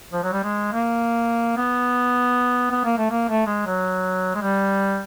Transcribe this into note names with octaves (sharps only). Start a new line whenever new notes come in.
F3
F#3
G3
G#3
A#3
B3
B3
A#3
A3
A#3
A3
G#3
F#3
G#3
G3